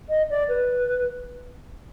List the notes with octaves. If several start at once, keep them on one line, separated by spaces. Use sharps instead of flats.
D#5
D5
B4